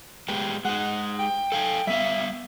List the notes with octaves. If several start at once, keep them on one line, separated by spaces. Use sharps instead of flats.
G#3 B3 G4
G#3 D#4 F#5
G5
A4 F5 G#5
G3 B3 E5 F5